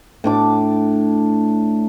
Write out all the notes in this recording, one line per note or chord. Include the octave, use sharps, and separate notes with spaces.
A2 D4 D6